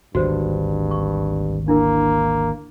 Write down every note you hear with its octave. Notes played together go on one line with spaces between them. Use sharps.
G#1 D2 G2 F#4 C5
C#6
A#3 D4 E4 A#4